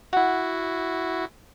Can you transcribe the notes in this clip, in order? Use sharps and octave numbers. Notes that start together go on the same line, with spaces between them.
E4 F#4 F#5